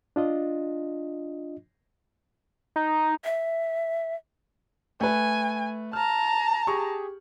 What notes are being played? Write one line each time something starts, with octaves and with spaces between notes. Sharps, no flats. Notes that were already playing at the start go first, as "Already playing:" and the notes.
D4 F4 D#5
D#4
E5
A3 B4 G#5
A5 A#5 F6
G4 G#4 C#6